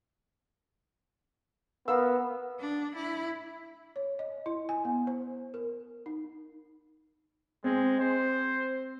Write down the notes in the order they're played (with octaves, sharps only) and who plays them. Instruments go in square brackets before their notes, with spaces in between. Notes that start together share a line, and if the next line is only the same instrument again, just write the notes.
[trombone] B3 [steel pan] A#4 F5 E6
[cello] D4
E4
[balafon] C#5
D#5
E4
G#5
B3
C5
A#4
D#4
[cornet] G#3 [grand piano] C4
[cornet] C5